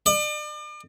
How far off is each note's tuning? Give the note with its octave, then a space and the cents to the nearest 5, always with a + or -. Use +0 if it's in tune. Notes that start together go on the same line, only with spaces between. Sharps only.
D5 +40